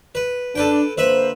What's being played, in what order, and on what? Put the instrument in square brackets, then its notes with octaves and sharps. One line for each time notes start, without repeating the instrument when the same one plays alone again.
[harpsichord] B4
[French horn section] D4 [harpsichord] A4 B4 G5
[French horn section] D3 A#3 C5 [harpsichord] B4 E5 B5